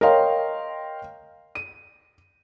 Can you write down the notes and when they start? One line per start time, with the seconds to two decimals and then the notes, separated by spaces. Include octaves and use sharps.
0.01 A#4 C#5 D#5 F5 G5 C6
1.55 D#7